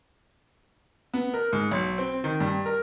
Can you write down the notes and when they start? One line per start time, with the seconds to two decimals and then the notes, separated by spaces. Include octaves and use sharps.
1.14 B3
1.34 A#4
1.53 G#2
1.71 B1
1.98 C4
2.24 D#3
2.40 G2
2.66 A#4